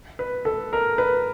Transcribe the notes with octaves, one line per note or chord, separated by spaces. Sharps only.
B4
A4
A#4
B4